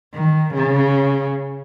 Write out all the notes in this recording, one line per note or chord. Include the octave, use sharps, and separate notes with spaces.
D#3
C#3